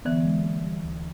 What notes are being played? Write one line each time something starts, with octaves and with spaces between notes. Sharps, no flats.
D3 E3 B3
G#3
A#3
G3
D2